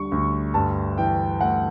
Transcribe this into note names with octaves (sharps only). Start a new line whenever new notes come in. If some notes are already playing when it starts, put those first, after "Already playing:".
Already playing: D2 D3 G3 C#6
D2
G2 A5
E3 G5
A3 F#5